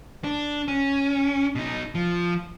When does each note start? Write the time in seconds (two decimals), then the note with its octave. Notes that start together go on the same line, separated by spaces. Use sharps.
0.24 D4
0.68 C#4
1.55 B2 D#4
1.95 F3